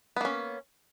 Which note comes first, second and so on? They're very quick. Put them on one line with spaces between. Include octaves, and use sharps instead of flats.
B3 A#3 C#4